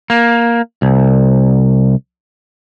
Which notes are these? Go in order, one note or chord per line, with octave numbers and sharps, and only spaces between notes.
A#3
C2